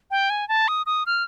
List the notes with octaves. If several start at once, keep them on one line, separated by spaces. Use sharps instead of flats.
G5
G#5
A5
D#6
D#6
F6